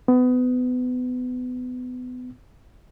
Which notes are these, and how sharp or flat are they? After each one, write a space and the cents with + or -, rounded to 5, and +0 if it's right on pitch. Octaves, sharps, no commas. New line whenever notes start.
B3 +25